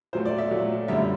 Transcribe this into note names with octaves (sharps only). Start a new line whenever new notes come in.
A#2 F#3 A3 C5
D5
E5
A#2 F#3 A3
F#2 D3 G3 E5